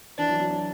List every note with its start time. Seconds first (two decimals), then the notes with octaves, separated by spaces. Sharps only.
0.18 E3 D4
0.29 F#3
0.40 F#3
0.51 F#3